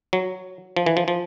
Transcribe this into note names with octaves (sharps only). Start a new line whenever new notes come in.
F#3
F3
E3
F3
F3